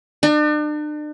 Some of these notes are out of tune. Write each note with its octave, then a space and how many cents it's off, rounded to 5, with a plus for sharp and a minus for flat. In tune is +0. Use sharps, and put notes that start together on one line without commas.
D4 +40